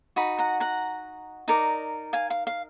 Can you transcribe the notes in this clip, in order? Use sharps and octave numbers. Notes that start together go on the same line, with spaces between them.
D#4 F#4 B5
F#5 A#5
F#5 A#5
D#4 A#4 D5
F5 G#5
F5
F5